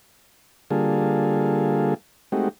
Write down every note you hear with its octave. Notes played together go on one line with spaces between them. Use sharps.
D3 G3 A#3 F4 G#4 A4
G#3 A3 C4 D#4 F#4 G4